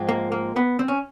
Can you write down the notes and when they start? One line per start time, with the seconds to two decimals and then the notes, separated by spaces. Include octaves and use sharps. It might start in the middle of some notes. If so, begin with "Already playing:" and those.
Already playing: G#2 F3 G#3 C4
0.09 A#3
0.32 A#3
0.56 B3
0.79 C4
0.88 C#4